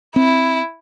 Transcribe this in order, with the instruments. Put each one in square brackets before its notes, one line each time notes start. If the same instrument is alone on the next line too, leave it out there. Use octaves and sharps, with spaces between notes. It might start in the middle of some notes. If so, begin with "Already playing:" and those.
[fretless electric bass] C4 [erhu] E4